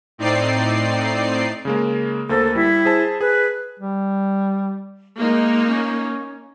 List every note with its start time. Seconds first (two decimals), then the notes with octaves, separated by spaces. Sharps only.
0.18 A2 C4 D#4 D5 C7
1.65 C#3 G#3 A#3
2.29 D2 A#3 A4 C5
2.55 G3 E4
2.85 G#4 C5 A5
3.21 G#4 B4
3.80 G3
5.18 G#3 A#3 D#4
5.68 C#4